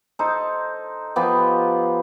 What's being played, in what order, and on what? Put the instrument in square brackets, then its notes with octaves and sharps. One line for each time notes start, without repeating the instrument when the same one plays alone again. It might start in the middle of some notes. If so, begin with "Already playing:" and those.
[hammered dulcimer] D#4 A4 C5
F3 B3 G4